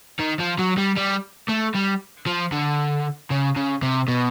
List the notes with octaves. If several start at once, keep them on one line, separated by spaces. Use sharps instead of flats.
D#3
F3
F#3
G3
G3
A3
G3
F3
D3
C#3
C#3
C3
B2